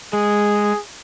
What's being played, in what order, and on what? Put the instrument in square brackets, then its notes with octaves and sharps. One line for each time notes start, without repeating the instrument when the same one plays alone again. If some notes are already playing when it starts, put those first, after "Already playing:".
[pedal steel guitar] G#3 [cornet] G#4